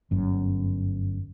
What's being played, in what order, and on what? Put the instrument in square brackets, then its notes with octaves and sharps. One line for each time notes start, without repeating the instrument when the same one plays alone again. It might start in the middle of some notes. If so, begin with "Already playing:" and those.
[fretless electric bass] G1 F#2